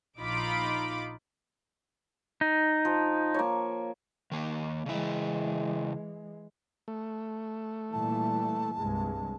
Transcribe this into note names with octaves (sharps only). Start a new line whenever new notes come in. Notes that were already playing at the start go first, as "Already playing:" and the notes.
A#1 D#4 F4 B5 D6
D#4
F3
A#3 C#5
D#3 A#3
C#3 E3 G#3 E4
A3
A#2 E3 G3 A5
C2 G2 G#3